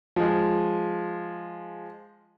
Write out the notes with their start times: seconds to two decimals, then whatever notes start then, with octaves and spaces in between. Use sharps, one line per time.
0.16 F3 G#3